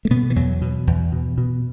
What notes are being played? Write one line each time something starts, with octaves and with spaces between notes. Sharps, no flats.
A3
B2 B3
E3
E2 F#3
B2
E2
B2
B2